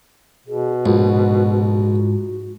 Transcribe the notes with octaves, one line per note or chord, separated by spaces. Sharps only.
B2 G#4
A#1 G#2 F#4